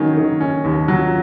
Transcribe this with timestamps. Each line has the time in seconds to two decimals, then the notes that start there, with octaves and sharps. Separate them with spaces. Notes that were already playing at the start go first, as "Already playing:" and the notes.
Already playing: D#3 F#3 A#3 C#4
0.17 D#3
0.41 C#4 D#4
0.64 D#2
0.88 F#3 F4